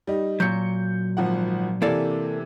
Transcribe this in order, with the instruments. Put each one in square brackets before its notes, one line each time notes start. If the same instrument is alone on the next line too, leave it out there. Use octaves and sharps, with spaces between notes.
[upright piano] G3 D#4
[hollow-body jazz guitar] A#2 F#3 [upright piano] G6 C#7
[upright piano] G#1 F3 F#5
[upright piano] C3 E3 [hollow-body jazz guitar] A#3 A4 D5